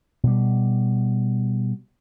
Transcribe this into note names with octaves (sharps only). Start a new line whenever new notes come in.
B2 G3